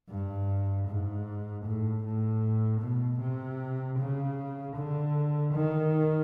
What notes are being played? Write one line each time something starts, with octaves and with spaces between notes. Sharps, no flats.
G2
G#2
A2
A2
B2
C3
C#3
D3
D#3